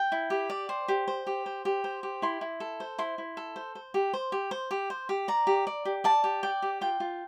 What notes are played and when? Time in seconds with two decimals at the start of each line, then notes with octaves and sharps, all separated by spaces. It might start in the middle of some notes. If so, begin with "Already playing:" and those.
Already playing: G5
0.12 E4
0.30 G4
0.50 D5
0.69 C5
0.88 G4
1.08 C5
1.27 G4
1.46 C5
1.65 G4
1.84 C5
2.03 G4
2.22 E4 C6
2.41 E4
2.60 A4
2.80 C5
2.98 E4 C6
3.18 E4
3.37 A4
3.56 C5
3.75 C5
3.94 G4
4.14 C5
4.32 G4
4.51 C5
4.71 G4
4.90 C5
5.09 G4
5.28 D5 A#5
5.47 G4
5.67 D5
5.85 G4
6.04 D5 A5
6.24 G4
6.43 D5 G5
6.62 G4
6.81 F4 G5
7.00 F4